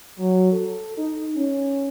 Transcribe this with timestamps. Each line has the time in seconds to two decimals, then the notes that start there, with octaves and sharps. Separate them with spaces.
0.18 F#3
0.52 A4
0.98 D#4
1.36 C#4